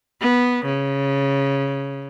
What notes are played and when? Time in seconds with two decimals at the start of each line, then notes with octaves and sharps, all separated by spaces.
0.21 B3
0.65 C#3